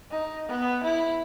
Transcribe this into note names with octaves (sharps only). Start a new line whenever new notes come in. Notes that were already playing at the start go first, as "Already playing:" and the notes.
D#4
B3
E4